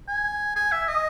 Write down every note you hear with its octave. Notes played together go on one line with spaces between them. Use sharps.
G#5
G#5
E5
D#5